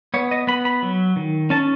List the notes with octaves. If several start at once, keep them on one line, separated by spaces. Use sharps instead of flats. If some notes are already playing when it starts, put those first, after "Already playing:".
B3 C#5
D#5
B3 B5
B5
F#3
D#3
C#4 A5